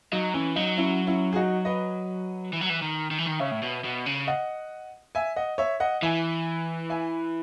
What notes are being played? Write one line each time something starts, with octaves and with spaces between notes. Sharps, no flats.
F#3 D#4
E3 C#4
F#3 D#4
C#4 E4
C#4 E4
G#4
D#4 F#4
B4 D#5
E3
F#3
E3
D#3
D#3
E3
D#3
C#3 C#5 E5
A2
B2
B2
C#3
D#5 F#5
E5 G#5
D#5 F#5
C#5 E5
D#5 F#5
E3 E5 G#5
E5 G#5